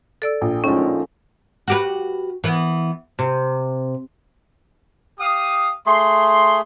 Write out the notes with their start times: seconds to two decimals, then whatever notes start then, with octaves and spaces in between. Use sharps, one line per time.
0.22 A4 D5 E6
0.41 A#1 G5
0.64 A2 F3 G#3 C#4 D#4 A#5
0.76 A#2 D3
1.68 F#4 G4 B4
2.44 E3 B3
3.19 C3
5.19 G4 F5 D#6
5.86 A3 G#4 C6